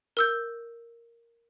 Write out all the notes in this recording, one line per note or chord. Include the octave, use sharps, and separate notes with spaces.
A#4 E6 G6